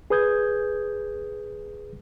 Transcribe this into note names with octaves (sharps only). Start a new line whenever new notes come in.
G#4 B4 D#6 G6 G#6